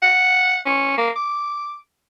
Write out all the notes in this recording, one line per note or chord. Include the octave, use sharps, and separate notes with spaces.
F#5
C#4
A#3
D6